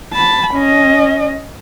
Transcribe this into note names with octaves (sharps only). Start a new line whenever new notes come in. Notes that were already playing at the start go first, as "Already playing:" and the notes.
A5 B5
C#4 D#5